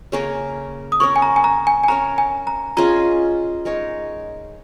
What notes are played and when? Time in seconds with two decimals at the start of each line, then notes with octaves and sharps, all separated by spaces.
0.12 C#3 A#3 C#4 A#4
0.92 D#6
1.00 C#4 A#4 C#5 C#6
1.16 G#5
1.22 A#5
1.36 G#5
1.44 A#5
1.67 G#5
1.84 G#5
1.88 C#4 A#4 C#5 A#5
2.18 G#5
2.47 A#5
2.77 C#4 F4 G#4 D#5 A#5
3.65 G#3 D#4 A#4 C#5